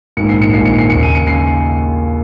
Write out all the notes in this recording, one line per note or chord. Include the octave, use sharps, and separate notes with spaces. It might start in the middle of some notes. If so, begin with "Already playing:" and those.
A#1 G#2 D#3 C#7
C7
C#7
A#1 G#2 D#3 C7
C#7
C7
D#2 C#3 C#7
D#7
C#7
C#3 C7